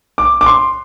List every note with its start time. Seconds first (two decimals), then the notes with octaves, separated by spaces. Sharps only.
0.18 D6
0.41 D6
0.46 C6